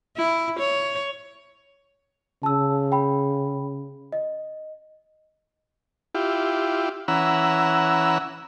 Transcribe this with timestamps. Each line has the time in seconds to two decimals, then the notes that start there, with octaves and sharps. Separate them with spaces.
0.17 E4
0.60 C#5
2.43 C#3 A5 E6
2.92 G5 B5
4.12 D#5
6.15 E4 F4 G4
7.08 E3 C#4 F#5 A#5 B5 E6